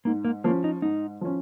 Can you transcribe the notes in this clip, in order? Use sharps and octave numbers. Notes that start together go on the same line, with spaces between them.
G#2 A#3
A#3
F3 A#3 C#4
D#4
G#2 D#4
F3 C#4